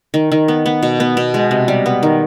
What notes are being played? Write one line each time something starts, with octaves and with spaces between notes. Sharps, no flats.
D#3
D#3
B3
B3
B2
B3
B2
G#3
C3
G3
B3
D#3